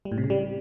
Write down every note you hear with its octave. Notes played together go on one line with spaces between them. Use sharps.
G3
A2
C3
C#3
G3